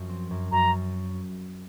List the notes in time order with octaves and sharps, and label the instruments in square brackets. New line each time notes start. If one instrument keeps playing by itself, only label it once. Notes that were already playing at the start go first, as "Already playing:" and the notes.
Already playing: [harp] F#2 F3
C4
F#2
[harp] F#2 [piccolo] A#5